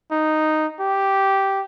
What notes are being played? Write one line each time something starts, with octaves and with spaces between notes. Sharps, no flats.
D#4
G4